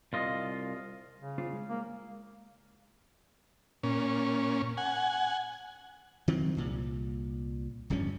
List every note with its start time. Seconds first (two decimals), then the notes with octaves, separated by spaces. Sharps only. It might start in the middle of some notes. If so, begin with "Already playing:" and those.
0.13 C2 F4 D#5
1.19 C#3
1.38 D4 F4 C5
1.53 G#3
1.69 A#3
3.83 A#2 C#4
4.77 F#5 G#5
6.28 D#3 F#3 C4
6.57 C2 A#2
7.90 D1 G2 F3 C#4